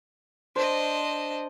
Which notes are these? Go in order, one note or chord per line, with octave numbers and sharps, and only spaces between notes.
D4 C5 D#5